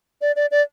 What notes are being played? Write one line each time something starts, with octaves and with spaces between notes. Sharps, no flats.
D5
D5
D5